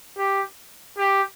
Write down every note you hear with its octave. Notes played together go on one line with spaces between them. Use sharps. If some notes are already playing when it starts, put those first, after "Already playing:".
G4
G4